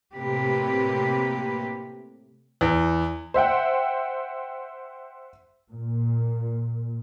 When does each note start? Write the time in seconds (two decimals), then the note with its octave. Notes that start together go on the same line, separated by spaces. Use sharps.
0.15 A2 C3 A3 A#3 G4 B4
2.61 E2
3.34 C5 E5 F#5 G5
5.70 A#2